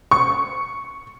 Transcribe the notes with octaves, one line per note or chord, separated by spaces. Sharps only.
C#6